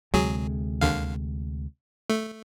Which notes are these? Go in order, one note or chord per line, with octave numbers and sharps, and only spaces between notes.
D2 C3 F#3 G#3 G#4
D#2 D3 F5
A3